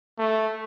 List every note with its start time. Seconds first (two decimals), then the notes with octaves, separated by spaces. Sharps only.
0.19 A3